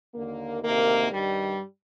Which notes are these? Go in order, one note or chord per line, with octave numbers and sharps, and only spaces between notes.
D#2 D3 A#3
D2 C3 D#3 A#3
G2 D#3 G3